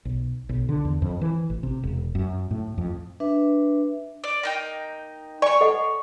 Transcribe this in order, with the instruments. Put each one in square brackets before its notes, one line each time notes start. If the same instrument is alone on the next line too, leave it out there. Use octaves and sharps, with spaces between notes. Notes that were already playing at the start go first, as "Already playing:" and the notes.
[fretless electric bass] B1
B1
D3
E2
F2
E3
A1
C3
E1
F#2
A2
F2
[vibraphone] D4 B4 E5
[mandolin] D5
A#3 D#4 G5
[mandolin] C#5 C#6 [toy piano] D5 G#5
[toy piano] A4 D#5 F#5